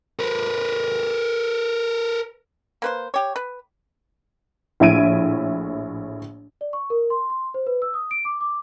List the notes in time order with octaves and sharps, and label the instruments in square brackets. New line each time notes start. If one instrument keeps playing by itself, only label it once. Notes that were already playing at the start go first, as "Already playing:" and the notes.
[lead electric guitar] A#4 B4
[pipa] A#3 B4 C5
G4 C#5
B4
[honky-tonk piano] A#1 A2 E5 G#6 D7 D#7
[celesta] D5
C#6
A#4
C6
C6
C5
B4
E6
D#6
D7
D6
D6